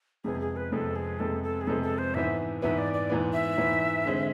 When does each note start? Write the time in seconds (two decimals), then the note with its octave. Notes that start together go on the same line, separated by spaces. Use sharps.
0.24 F2 C3 G#3 B3 G#4
0.41 G#4
0.56 B4
0.72 F2 C3 G#3 B3 A4
0.96 G#4
1.19 F2 C3 G#3 B3 A4
1.43 A4
1.61 G#4
1.67 F2 C3 G#3 B3 A4
1.83 A4
1.98 C5
2.14 G#2 E3 B3 E5
2.62 G#2 E3 B3 E5
2.78 D5
2.94 D5
3.10 G#2 E3 B3
3.33 E5
3.57 G#2 E3 B3
4.05 D3 G#3 C4